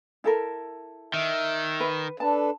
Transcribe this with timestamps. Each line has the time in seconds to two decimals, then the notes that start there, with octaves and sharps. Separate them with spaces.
0.24 E4 A4 A#4
1.14 D#3 E5
1.80 B4
2.20 D4 A4 B4 A5